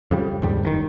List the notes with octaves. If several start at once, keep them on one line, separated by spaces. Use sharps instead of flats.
F2 C#3 G3
D#2 G#2 G3
F#1 A2 D#3